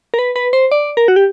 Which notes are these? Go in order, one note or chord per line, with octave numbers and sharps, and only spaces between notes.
A#4
B4
B4
C5
D5
A#4
F#4
G4